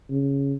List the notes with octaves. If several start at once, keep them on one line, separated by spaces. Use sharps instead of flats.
C#3